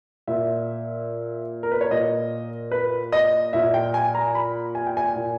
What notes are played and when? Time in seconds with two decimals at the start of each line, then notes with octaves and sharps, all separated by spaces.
0.27 A#2 E5
1.63 A#4
1.72 B4
1.81 C#5
1.91 A#2 D#5
2.72 B4
3.12 D#5
3.53 A#2 E5
3.74 G5
3.94 G#5
4.15 A#5
4.35 B5
4.75 G#5
4.87 G5
4.97 G#5
5.16 A#2